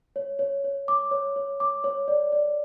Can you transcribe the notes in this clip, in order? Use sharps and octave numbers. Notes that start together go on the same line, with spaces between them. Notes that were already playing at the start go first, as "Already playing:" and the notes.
C#5
C#5
C#5
D6
C#5
C#5
D6
C#5
D5
D5